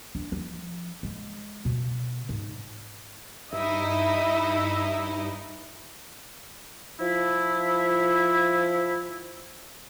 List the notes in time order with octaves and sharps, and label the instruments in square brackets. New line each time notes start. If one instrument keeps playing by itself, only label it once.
[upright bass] D4
F3
G#3
B2
G#2
[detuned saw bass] G2 [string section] D#4 E4 D#5 [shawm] E5
[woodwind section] F3 E4